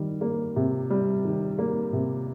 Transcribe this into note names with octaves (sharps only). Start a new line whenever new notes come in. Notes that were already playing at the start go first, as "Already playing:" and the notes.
Already playing: D#3 G3
A#3
C3
G3
D#3
A#3
C3